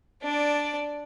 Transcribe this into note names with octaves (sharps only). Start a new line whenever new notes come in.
D4 D5